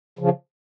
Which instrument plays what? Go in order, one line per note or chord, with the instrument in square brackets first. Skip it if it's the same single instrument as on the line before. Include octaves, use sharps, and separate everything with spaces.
[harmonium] C#3 F3